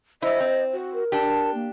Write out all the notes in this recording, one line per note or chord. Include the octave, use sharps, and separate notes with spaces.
E4 C5 D#5
C4
F#4
A#4
D4 G4 A5
A#3